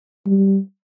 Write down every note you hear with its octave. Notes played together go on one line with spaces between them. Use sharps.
G3